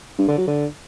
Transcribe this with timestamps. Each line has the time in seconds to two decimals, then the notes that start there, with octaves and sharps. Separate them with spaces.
0.18 G2
0.28 D3
0.38 F#3
0.47 D3